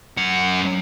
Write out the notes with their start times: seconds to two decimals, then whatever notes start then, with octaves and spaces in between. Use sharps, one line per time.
0.17 F#2 F#5